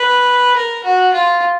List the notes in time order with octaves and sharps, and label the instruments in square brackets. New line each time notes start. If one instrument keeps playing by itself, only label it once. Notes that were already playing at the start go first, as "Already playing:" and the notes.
Already playing: [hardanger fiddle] B4
A#4
F#4
F4